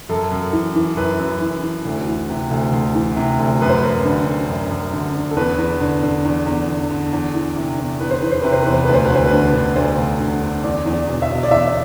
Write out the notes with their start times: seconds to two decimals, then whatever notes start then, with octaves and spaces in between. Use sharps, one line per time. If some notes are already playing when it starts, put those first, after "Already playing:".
0.09 F#2 A4
0.31 F#2
0.53 E3
0.75 E3
0.97 F#2 B4
1.19 F#2
1.41 E3
1.63 E3
1.85 D2
2.07 E3
2.29 C3
2.51 D2
2.72 D2
2.95 E3
3.16 C3
3.39 D2
3.61 F#2 B4
3.69 C5
3.78 B4
3.83 F#2
4.05 D3
4.27 D3
4.49 F#2
4.70 F#2
4.93 D3
5.15 D3
5.31 A4
5.36 E2 B4
5.58 E2
5.81 D3
6.03 D3
6.25 E2
6.47 E2
6.69 D3
6.90 D3
7.13 E2
7.35 E3
7.56 C3
7.78 E2
8.00 E2 B4
8.11 C5
8.21 E3 B4
8.32 C5
8.42 C3 B4
8.52 C5
8.63 E2 B4
8.73 C5
8.84 D2 B4
8.94 C5
9.05 B4
9.10 D2
9.15 C5
9.25 B4
9.32 D3
9.54 D3
9.76 D2 C5
9.98 D2
10.20 D3
10.42 D3
10.64 E2 D5
10.86 E2
10.93 D5
11.07 B2
11.22 E5
11.30 B2
11.43 D5
11.51 E2 E5